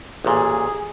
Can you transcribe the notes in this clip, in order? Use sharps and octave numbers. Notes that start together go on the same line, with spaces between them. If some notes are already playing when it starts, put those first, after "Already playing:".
A1 A#2 G#4